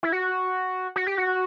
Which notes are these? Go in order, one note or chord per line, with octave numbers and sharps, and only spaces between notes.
E4
F#4
F#4
G4
F#4